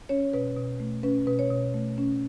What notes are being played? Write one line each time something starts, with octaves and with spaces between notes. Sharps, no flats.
C#4 C#5
B2 B4
B2
A3
C#4 B4
B2 B4
C#5
B2
A3
C#4